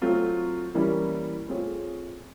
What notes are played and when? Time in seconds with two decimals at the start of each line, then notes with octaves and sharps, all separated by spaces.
0.02 F#3 A3 C4 F4
0.74 E3 G3 A#3 C#4 E4
1.48 A3 C4 F4 G#4 C#5